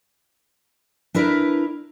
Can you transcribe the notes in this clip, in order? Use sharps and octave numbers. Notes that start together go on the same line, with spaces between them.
D4 E4 A#4 B4